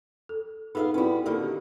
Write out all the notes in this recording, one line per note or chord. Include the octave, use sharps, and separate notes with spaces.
A4
B3 D#4 G#4 A4 E5 F5
G3 B3 C4 E4 F#4
D3 D#3 A#3 G4